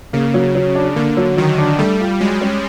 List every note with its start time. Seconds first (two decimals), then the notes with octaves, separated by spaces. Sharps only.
0.13 C#3 A#3
0.34 F#3
0.55 F#3
0.75 D4
0.96 D3 A#3
1.17 F#3
1.37 D#3 F#3
1.58 D4
1.79 G3 A3
2.00 F4
2.20 F#3 G#3
2.41 C#4